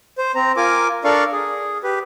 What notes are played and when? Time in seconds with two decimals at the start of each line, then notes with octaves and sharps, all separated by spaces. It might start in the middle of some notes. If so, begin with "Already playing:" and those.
0.18 C5
0.35 C4 A#5
0.57 F4 A#4 G#5 D6
1.04 D4 A4 A#4 D5 F5 C#6
1.32 G#4
1.83 G4 B4